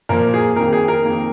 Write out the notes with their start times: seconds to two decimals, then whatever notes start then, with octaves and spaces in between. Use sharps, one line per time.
0.09 A#2 F3 A#3 A#4
0.34 G#4
0.56 F2 D#3 A#3 A#4
0.73 G#4
0.88 A#4
1.04 F2 D#3 A#3